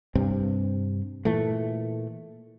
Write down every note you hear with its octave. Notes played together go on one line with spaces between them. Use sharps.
G2 C3 C4
A#2 E3 A3